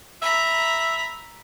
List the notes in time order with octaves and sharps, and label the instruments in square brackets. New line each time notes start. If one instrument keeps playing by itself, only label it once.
[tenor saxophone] E5 [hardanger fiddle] A#5 B5